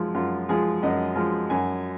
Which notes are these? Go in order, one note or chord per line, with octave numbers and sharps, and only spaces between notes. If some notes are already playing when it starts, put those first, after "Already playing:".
Already playing: F#2 F3 G#3
F#2 F4
F3 G#3 G#4
F#2 D#5
F3 G#3
F#2 G#5